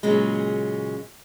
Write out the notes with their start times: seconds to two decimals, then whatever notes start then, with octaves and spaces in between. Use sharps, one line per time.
0.03 A#2 C#3 F#3 G#3